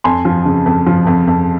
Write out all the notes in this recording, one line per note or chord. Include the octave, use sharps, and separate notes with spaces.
F2 G#5 C6
F3
C#3
F2
F3
F2
F2